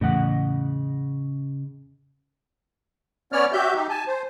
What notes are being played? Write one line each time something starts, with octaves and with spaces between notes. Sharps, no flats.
E2 A2 C#3 D#5 F#5
B3 C#4 C#5 D5 F6
F#4 G4 E5 G6
D#4 G4
G#5 A5
C5